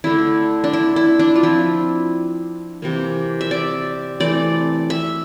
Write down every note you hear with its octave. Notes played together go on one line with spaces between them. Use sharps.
D3 A3 D4 E4
D4
E4
E4
D4
F4
F3 C4 E4
C3 E3 A#3
E5
D5
E3 A3 C4 D5
E5